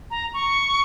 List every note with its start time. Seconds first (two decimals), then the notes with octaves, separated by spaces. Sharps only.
0.11 A#5
0.34 C#6